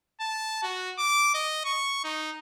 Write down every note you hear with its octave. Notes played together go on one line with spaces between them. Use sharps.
A5
F#4
D6
D#5
C#6
D#4